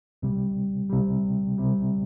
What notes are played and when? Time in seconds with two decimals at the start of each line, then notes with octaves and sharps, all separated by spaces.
0.23 C2 C3 G3
0.90 C2 C3 G3
1.58 C2 C3 G3